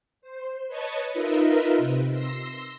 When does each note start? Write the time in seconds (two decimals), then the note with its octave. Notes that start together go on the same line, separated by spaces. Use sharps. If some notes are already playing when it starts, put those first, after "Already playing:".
0.22 C5
0.68 B4 C#5 D#5 A5 C#6
1.14 D#4 F4 A#4 B4 D#5 E5
1.78 C3
2.14 C6 E6 A#6 C7